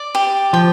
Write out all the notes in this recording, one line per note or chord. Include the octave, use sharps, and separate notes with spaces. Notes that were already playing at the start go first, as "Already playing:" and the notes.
Already playing: D5
G4
F3 G5